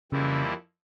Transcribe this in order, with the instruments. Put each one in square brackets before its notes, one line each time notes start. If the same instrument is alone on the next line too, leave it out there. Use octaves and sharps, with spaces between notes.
[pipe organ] F2 E3 G3 A#3 E4 [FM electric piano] C#3